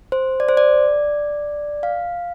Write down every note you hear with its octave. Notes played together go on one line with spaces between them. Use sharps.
C5
D5
C5
D5
F5